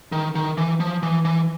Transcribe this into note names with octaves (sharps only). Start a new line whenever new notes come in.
D#3
D#3
E3
F3
E3
E3